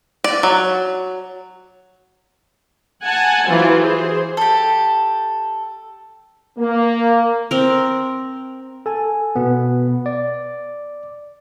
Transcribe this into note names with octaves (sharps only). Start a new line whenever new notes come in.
D5
F#3
F#5 G#5 A5
E3 F#3 F4 C5
G#4 C5
G4 A4
A#3
C4 A#4
A4 G#5
B2 B3
D5